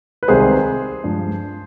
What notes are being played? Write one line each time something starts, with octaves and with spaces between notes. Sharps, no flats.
B4
C2 C3 D#3 G#3 G#4 C5
G2 F3 G#3